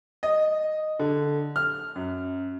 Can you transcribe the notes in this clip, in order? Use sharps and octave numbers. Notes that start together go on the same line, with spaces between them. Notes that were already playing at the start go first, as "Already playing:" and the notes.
D#5
D3
F6
F#2